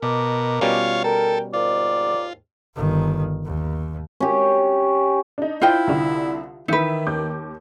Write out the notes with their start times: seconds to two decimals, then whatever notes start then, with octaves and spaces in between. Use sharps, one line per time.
0.02 B2 A#4 D#5 A5 D6
0.61 B2 G3 C#4 F4 C#5 F5
1.04 A4 A#4 G5
1.53 D#2 G#2 F4 D5
2.76 G1 D#3
3.45 D#2
4.20 C#4 G4
5.38 D4 D#4
5.62 E4 F4 C5 G5
5.87 C2 D3
6.68 D#3 E3 D#4 B4 E5
7.07 D#2 D6 G6